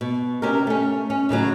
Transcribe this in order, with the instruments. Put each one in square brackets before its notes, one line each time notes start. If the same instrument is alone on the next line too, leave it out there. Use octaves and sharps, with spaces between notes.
[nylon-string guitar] B2
C3 C#4 G4 A#4
A3 C#4
C#4
A2 C#3 E3 F#3